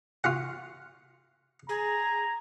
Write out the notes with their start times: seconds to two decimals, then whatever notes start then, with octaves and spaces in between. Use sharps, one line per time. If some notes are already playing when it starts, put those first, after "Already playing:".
0.24 F4 F#4 F#5
1.69 G#4 A#5